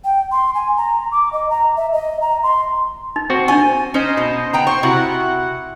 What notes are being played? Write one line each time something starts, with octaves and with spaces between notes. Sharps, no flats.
G5
C6
G#5
A#5
D6
D#5
A#5
E5
D#5
A#5
C6
D#4
C4 F#4
D4 D#4 G#5 C#6
C#4 D#4 C5 D#5
B2
B3 G5 A#5
C5 C#6
C3 E4 F#4 F#5